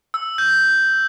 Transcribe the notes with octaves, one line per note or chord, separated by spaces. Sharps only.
E6
G6